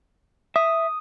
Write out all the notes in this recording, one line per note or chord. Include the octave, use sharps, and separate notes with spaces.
E5 D#6